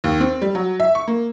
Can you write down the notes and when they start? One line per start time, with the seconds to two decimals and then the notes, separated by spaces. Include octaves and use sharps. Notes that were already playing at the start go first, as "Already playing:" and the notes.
0.04 D#2
0.20 C4
0.42 G3
0.55 F#3
0.80 E5
0.95 C#6
1.08 A#3